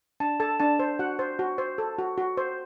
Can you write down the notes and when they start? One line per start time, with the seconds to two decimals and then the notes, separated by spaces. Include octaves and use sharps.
0.20 D4 A5
0.40 A4 A5
0.60 D4 A5
0.79 C5
0.99 F#4 F#5
1.19 C5
1.39 F#4
1.58 C5
1.78 A4
1.99 F#4
2.18 F#4
2.37 C5